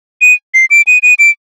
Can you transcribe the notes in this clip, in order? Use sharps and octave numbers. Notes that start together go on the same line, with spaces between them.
D#7
C7
D7
D#7
D#7
D7